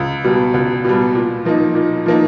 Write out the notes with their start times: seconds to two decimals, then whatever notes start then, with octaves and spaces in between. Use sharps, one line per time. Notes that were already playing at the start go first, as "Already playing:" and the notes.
Already playing: C#2
0.24 B2 G3
0.54 C#2
0.84 B2 G3
1.15 A#2
1.45 F3 A#3 D#4
1.75 A#2
2.06 F3 A#3 D#4